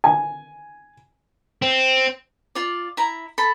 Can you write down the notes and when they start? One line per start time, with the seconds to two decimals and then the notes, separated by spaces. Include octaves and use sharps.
0.04 G#5
1.62 C4
2.55 F4 D5
2.97 E4 A#5
3.38 A4 B5